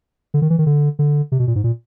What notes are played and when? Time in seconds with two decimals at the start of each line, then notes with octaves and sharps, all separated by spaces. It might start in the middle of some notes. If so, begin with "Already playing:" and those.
0.34 D3
0.42 D#3
0.50 E3
0.59 D#3
0.66 D3
0.99 D3
1.32 C3
1.39 B2
1.47 A#2
1.56 G#2
1.64 A#2